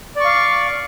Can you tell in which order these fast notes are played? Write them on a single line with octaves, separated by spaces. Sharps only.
D5 C#6 F5